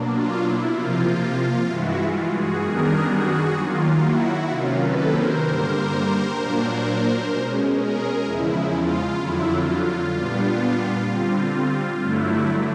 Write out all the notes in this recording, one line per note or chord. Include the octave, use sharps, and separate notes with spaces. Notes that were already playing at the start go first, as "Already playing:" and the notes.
Already playing: B2 F#3 A#3 D4
F4
E4
C3 F3 A#3 F4
G2 E3 G#3 E4 F#4
F4
F#4 G#4
F#2 D#3 G3 B3 D4 G#4 A#4
F#4 G#4
D#3 F#3 A#3 F4
E4 F#4
C3 D#3 F#3 A#3 C#4 F4
A4 B4
A#4 C5
G2 D3 G3 A#3
A#2 F#3 A#3 D4
B2 G#3 C#4
G#4 A#4
E2 C#3 F3 G#3 E4
F4
F2 D3 F#3 E4
F4
F4
A#2 G3 B3 D4
D3 G3 C4
G2 D3 F#3 A3 E4